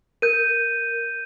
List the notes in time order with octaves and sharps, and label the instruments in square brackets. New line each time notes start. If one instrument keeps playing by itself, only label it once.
[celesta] A#4 [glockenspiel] G6 D#7